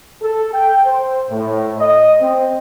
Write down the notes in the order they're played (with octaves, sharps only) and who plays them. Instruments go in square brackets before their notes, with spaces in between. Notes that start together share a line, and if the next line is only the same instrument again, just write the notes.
[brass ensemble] A4
G5
C5
A2
D#5
C4